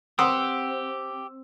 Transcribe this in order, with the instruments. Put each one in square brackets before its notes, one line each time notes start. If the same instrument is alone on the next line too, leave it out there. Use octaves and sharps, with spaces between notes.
[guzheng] C4 [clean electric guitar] G4 [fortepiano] F#5 C6 D#6 [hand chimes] E6